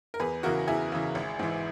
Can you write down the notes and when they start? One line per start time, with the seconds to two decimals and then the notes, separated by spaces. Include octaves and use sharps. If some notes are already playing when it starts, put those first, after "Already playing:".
0.14 A#4
0.20 E2 G#4 B4
0.43 C#3 E3 F#4 A#4
0.68 E2 E4 G#4
0.92 C#3 E3
1.15 G#1
1.39 G#2 E3